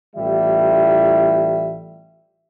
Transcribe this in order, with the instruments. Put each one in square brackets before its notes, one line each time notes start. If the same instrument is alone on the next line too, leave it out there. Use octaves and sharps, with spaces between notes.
[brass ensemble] A1 E3 G3 F4 E5